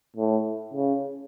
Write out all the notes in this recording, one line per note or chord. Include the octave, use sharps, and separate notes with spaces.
A2
C#3